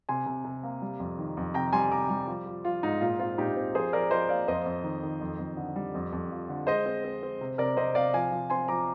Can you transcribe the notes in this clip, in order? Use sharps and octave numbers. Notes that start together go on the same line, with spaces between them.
C3 G#5 C6
C3
C3
A#3
G3
F2
D#3
F2
C3 G5 A#5
G3 G#5 C6
C3 A#5 D6
G3
F3
F3
F3 F4
G#2 D#4
A#2 F4
C4 F4
A#2 D#4 G4
C4
F3 G#4 C5
F3 A#4 D5
F3 C5 D#5
A#3 D5 F5
F2 C5 D#5
F2
D#3
D#3
F2
F2
D3
G3
F2
F2
F3
D3
G#3 C5 D#5
C4
C4
C4
C3
C3 A#4 D5
C3 C5 D#5
C3 D5 F5
F3 F5 G#5
F3
C4 G#5 C6
F3 A#5 D6